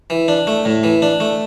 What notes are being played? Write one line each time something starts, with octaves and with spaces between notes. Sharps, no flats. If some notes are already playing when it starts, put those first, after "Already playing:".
E3
D4
A3
A2
E3
D4
A3